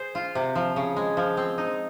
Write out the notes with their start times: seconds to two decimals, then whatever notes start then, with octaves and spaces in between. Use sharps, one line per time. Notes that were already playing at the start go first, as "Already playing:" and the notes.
Already playing: G#4 C5
0.15 F4
0.35 C3
0.55 F3
0.76 C#3
0.96 G#3
1.17 F3
1.37 C4
1.58 D#4